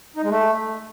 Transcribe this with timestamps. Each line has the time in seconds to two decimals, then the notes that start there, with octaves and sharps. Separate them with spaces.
0.16 D#4
0.23 G#3
0.30 A3